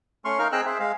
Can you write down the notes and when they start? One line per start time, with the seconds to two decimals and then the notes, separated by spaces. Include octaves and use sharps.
0.25 A3 C#4 C6 C#6 F6
0.39 D#4 A#4 F5 F6
0.52 C4 G#4 D#5 G5 E6 F#6
0.66 G#4 C5 E5
0.80 G#3 F5